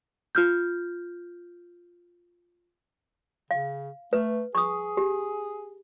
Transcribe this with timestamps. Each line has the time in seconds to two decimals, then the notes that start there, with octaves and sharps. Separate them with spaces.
0.35 F4 F6 G6
3.51 C#3 F5
4.13 A3 B4
4.55 G#4 C#6 D#6
4.97 G4